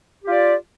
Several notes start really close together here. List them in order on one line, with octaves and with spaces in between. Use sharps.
G4 F4 D5